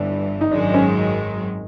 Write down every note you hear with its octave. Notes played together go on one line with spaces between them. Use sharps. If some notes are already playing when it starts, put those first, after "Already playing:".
Already playing: G1 G2 E3 D4
D#4
G#1 F#2 D#3 G#3 D4
C#4